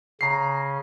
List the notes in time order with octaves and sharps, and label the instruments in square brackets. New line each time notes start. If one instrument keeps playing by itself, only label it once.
[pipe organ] C#3 [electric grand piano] A#5 C7